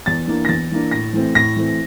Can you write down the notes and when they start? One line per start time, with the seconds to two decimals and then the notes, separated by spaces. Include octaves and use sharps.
0.06 E2 A6
0.27 E3 A#3 D4
0.45 A#6
0.49 E2 A6
0.71 E3 A#3 D4
0.91 A2 A#6
1.13 E3 A3 C4
1.35 A2 A#6
1.56 E3 A3 C4